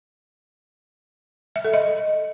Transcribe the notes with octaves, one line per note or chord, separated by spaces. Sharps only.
E5
A4
D#5